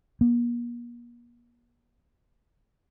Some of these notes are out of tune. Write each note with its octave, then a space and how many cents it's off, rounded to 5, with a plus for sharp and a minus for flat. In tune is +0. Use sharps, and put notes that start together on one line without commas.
A#3 +40